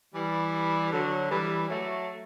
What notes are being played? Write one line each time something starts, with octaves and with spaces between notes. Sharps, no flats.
E3 G3
D3 F#3
E3 G3
F#3 A3